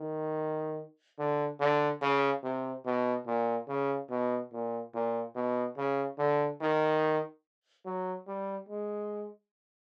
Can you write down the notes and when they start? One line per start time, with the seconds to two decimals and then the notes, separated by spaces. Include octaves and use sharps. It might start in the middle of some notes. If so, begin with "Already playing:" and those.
Already playing: D#3
1.19 D3
1.60 D3
2.02 C#3
2.43 C3
2.86 B2
3.27 A#2
3.68 C#3
4.10 B2
4.52 A#2
4.94 A#2
5.36 B2
5.77 C#3
6.18 D3
6.61 D#3
7.85 F#3
8.27 G3
8.69 G#3